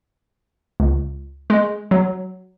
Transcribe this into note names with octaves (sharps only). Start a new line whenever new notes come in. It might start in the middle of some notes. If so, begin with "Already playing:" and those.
C#2
G#3
F#3